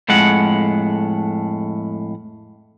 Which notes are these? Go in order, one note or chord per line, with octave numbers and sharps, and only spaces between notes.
F2 A2 G#3 F#5